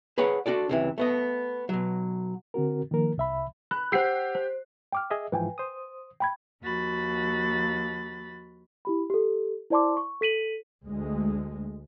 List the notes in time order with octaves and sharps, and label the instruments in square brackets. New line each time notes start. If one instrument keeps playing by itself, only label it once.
[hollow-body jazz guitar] G#4 B4 C#5 F#5 B5
D4 F#4 A4 D5
C#2 C3 E3
A3 B3 D#5
B2 F#3
[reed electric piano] D3 C4 F#4 A#4
D#3 F3 A#3 A#4
C2 E5 B5
[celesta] B5 [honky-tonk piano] F#6
[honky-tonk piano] G4 C7 [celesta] C5 F#5 E6
[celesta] C5
[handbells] G5 D6 F6
[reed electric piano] G#4 D#5 E5
[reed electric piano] G#2 E3 F3 [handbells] B4 G5 G#5
[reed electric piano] C5 D#6
[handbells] G5 B5 G#6
[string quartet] D#2 F3 F#4 B5 A6
[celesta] E4 G4 B5
G4 A4
E4 C5 D5 A5 C6 D6
C#6
A4 B6 D#7 F#7
[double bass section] D2 G#3